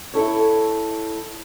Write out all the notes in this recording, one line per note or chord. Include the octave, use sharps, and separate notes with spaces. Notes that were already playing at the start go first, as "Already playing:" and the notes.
E4 A4 C#5